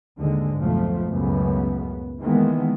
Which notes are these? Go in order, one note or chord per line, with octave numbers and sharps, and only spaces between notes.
D#2 G#2 D3 G#3
B1 F2 B2 F3 A3
C#2 F#2 A2 C#3 B3
D#3 E3 G#3 A#3 B3